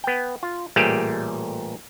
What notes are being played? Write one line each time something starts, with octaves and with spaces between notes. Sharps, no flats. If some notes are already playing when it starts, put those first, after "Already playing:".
B3 G5
F4
A1 A#2 G3 A3 G4 G#4